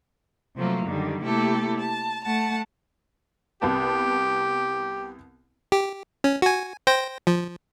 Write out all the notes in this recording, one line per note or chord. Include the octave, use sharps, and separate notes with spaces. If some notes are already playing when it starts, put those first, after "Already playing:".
C3 F3 F#3 A3 A#3
F#2 D3 D#3 G3
C3 A3 A#3 E4 G4 A4
A5
A3 F#5 A5
C2 B3 G4 A5
G4
C#4
F#4 G#5
C5 G5 A#6
F3